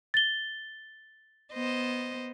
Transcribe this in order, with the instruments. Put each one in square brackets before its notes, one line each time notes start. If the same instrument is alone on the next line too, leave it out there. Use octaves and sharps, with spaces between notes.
[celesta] A6 G7
[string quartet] B3 C5 D#5